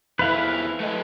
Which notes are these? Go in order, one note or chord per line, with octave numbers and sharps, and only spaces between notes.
F2 E4 B4 F5
A3 D#5